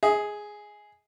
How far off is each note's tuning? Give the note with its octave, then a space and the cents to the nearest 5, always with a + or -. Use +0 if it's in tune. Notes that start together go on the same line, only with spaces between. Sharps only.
G#4 +0 D#5 +35